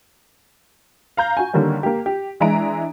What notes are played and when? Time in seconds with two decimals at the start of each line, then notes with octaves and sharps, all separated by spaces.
1.17 F5 A#5 G6
1.37 F#4 G#5
1.53 D3 D#3 G3 A#3 C#4
1.83 A#3 G4
2.06 G4
2.40 E3 G#3 D4 E5 A#5 D7